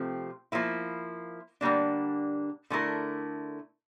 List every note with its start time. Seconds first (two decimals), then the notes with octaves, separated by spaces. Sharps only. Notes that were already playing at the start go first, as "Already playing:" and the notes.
Already playing: C3 F3 A3 C4
0.52 F3 A#3 E4
1.61 D3 G3 A#3 D4
2.70 D3 A3 E4 A#4